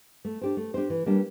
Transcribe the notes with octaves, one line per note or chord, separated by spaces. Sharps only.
A3
D4 G4 C5
A3
D4 G4 C5
E3
G3 A#3 D4